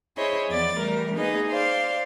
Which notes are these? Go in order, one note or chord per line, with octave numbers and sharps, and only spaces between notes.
E4 G#4 C5 C#5 D#5
E2 F3 B3 D5 A6
E3 G3 A3 A#4
A#3 D#4 G#4 B4 D#5
C5 D5 F5